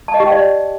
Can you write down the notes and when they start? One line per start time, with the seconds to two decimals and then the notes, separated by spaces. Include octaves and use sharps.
0.08 A5
0.14 D#5
0.20 G4
0.26 G5
0.31 D5